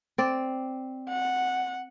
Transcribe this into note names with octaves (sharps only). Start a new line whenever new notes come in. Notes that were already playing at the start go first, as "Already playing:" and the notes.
C4 D5
F#5